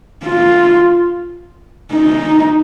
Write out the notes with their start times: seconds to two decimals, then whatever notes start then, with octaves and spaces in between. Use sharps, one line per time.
0.25 F4
1.93 D#4